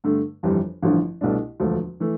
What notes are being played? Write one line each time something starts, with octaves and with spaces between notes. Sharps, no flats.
G2 D3 A3
G1 F2 E3 G3
A1 G2 D3 F3
C2 B2 A3 D4
E1 D2 D3 F3 A3
E3 A3